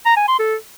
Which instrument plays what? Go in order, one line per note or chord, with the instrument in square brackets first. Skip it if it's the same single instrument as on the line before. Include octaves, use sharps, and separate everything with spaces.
[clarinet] A#5
G#5
C6
A4